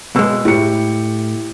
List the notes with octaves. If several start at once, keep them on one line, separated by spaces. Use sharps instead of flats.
B2 G#3 E6
A2 E4 G4 C#7